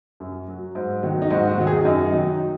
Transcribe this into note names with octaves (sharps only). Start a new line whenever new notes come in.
F#2
F#3
G#2
D#3 F#3
D#4
G#2 F#4
F#4
D#3 F#3
G#4
F#2 D#4
D#3 F#3